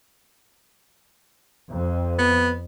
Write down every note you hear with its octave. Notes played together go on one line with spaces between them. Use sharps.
F2
B3